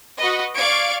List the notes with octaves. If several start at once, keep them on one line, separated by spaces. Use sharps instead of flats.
F#4 B4 D#5
D5 F5 C#6 G#6 D7